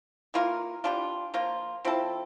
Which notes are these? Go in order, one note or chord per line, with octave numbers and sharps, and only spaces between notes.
E3 A#3 F4 A#4
E3 G3 D4 F4
F3 A#3 F4
F3 C4 E4 A4